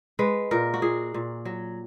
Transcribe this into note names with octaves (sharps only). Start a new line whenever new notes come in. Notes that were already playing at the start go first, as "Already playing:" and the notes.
G#3 B4
A#2 A#4
F#4
A#2 G#4
A#2
F#3